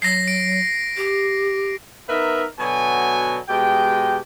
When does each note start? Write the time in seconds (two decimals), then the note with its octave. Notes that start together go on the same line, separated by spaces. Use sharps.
0.02 F#3 A#6 C7
0.28 D7
0.97 G4
2.09 B3 D#4 A#4 B4 E5
2.60 B2 D3 F#3 F#4 G#5
3.49 B2 G#3 G4 G5